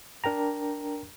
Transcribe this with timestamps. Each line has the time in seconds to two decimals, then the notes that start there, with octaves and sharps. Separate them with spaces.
0.24 D4 A#4 G5 A#5